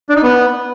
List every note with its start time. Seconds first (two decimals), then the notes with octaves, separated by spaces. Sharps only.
0.09 D4
0.16 D#4
0.23 B3